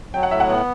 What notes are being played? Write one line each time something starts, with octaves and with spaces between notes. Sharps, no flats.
F#3 G5
F#5
A2 E5
F#5
B3